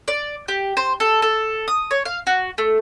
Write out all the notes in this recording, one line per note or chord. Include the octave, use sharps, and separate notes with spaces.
D5
G4
C5
A4
A4
D#6
C#5
F5
F#4
A3